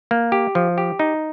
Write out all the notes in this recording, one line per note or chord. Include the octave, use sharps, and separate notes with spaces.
A#3
G4
F3
G4
D#4